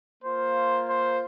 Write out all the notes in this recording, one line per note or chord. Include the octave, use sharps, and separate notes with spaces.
A#3 F4 C5
C5